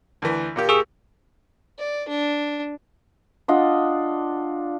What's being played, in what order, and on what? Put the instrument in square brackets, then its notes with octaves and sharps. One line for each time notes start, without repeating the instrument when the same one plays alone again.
[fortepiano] D2 E3
A#2 A#3 G4
[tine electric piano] G#4 C#6 E6
[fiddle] D5
D4
[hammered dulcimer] D4 F4 D#5 F#5